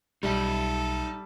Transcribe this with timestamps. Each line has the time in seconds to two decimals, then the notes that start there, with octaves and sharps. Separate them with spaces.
0.23 B1 G3 D#4 A4 E5